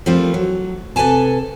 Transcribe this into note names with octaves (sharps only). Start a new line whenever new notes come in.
F3 G3 A3 A#3 C4 F4
F#3
C3 A4 B4 C#5 G#5 A5